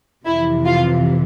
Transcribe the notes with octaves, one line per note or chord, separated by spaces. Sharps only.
F2 C3 E3 E4
F4